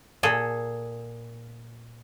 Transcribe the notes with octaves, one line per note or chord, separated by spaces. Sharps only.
A#2 G#4 A4